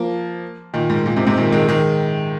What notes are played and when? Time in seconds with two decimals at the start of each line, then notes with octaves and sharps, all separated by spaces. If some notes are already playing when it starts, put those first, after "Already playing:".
Already playing: F3 A#3
0.74 A#2 D#3
0.90 G#2
1.06 A#2
1.16 G#2 C3
1.27 G#2 C3
1.37 A#2 D#3
1.52 D#3 G#3
1.68 D#3 G#3